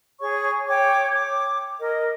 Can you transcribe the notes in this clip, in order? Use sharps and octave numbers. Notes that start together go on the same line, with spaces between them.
G#4 C#5 C#6
C#5 G5 D6
D6
A#4 D#5